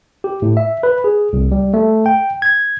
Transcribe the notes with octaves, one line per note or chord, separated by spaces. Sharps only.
G4
A2
E5
B4
G#4
C2
G3
A3
G5
G#6